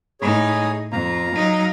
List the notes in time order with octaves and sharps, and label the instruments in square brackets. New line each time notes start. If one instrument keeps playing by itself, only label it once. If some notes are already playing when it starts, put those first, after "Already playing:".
[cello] A2 D#4 [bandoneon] G#4 C#5
[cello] F2 [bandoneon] F5 A#5
[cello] F#3 D#4